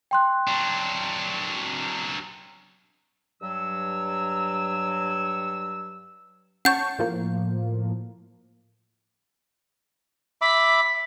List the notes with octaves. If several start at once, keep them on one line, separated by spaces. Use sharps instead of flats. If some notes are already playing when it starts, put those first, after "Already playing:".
G5 C6 F#6
F#3 D4
G2 F#3 E6
C#4 F#5 A5 C#6 G6
A2 F3 A#3
E5 B5 D6 B6